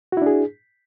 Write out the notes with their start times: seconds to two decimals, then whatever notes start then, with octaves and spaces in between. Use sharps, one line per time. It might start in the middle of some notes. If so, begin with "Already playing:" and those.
0.12 F#4
0.17 E4
0.22 D4
0.26 G#4